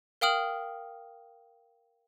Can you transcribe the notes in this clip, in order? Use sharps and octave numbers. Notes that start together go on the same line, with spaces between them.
A#4 F5 G5 D#6 F6 F#7